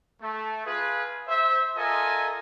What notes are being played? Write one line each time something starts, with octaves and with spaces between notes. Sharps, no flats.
A3
F4 G#4 B4
C5 E5
F4 A4 A#4 D#5 E5 G#5